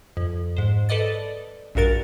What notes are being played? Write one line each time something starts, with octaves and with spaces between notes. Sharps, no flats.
F2
G#2 C5
A4 B4 D5 D#5 A6
A#1 G2 F#4 A#4 A6